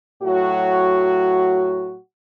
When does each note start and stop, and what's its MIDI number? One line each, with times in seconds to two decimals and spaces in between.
0.22 1.97 45
0.22 1.97 54
0.22 1.97 66